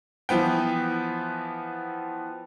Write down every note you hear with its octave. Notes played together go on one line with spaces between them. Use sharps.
E3 F3 B3 G5